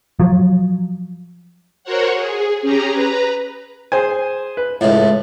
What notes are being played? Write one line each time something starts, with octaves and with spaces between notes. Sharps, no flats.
F3 F#3
F#4 A#4 C5 C#5 F#5
G#4
C#4 G4 G#4 A#5
B4 A#5
G#4 C5 G#5
B4
C#2 A2